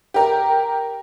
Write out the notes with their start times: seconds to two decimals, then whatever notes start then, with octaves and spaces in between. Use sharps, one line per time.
0.14 G4 A#4